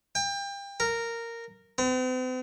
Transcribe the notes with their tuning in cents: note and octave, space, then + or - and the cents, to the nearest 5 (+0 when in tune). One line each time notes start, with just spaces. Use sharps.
G5 +30
A#4 -10
C4 -45